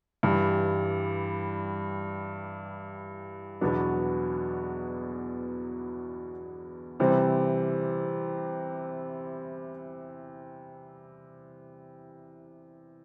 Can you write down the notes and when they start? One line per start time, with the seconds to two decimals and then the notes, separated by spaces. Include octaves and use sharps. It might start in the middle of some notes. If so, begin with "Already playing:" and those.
0.23 G2 E3 G3
3.61 E2 B2 F#3 B3 D4
7.00 C3 E3 G3 C4